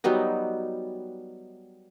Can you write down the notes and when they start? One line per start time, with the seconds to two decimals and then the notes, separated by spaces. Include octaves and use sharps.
0.04 F#3 G3 B3 D#4